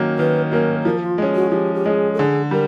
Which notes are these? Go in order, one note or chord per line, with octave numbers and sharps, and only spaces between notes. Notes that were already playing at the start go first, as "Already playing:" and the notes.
Already playing: D#3 F#3 A#3 C#4
D#3 B4
F#3 A#3 C#4 A#4
F3 A#4
F4
G#3 C#4
F#4
F3 G4
G4
G#3 C#4 G#4
A4
D3 G#4
G3 A#4